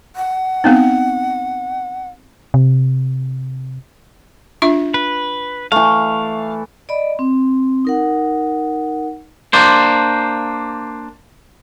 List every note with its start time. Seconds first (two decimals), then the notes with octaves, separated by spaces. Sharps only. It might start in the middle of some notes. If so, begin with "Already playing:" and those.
0.16 F#5
0.64 B3 C4 D#4
2.54 C3
4.62 D4 F4 E5
4.94 B4
5.72 E3 A3 F5
6.89 D5 D#5 B5
7.19 C4
7.85 D#4 A#4 F#5
9.53 A#3 D4 C5